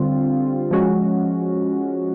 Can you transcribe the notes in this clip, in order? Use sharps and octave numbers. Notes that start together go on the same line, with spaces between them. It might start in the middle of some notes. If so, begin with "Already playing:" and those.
Already playing: D3 G3 C4 F4
F3 G#3 C#4 F#4